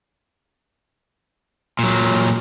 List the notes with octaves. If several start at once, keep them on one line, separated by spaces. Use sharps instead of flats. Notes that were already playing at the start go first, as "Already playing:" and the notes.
A#2 F#3